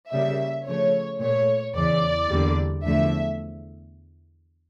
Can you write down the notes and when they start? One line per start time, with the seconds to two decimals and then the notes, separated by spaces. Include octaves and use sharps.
0.11 C#3 G3 A#3 E5
0.66 C#3 F3 A3 C#5
1.20 A#2 A3 C#5
1.75 E2 C#3 E3 D5
2.29 E2 D3 G3 A#3
2.84 E2 D3 F3 A3 E5